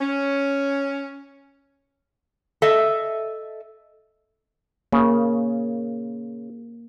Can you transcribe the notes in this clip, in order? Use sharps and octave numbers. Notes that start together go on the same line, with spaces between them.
C#4
A4 D#5 E5
C#3 A#3